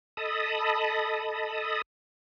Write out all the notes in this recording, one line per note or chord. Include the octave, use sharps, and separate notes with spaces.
A4 D#5 A5 B5 D#6